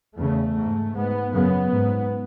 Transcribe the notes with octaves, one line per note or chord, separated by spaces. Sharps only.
E2 C#3 A3
G#2
G#2 B3
F#2 C#3 B3
G#2